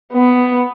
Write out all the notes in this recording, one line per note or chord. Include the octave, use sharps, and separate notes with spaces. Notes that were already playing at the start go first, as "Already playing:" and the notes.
B3